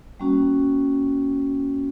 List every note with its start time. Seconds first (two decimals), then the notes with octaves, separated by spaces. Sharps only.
0.20 G3 A#3 C#4 F#4